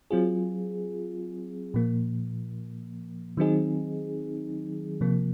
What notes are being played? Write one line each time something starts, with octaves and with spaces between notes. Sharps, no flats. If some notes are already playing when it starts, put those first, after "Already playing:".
F#3 C4 F4 G#4
A#2 F3 A#3
D#3 F#3 C4 D#4 G#4
C3 F3 A#3